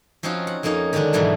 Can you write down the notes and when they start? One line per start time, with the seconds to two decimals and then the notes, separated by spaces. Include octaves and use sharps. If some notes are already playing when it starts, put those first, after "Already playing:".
0.23 F3 C4 C#4 D#4 F4 F#4
0.47 F#5
0.63 F2 A#3 C#4 D#4 C#5
0.93 D3 D#3 G#3 C#4 D4
1.13 G#2 B2 E3 F#3 G3 A3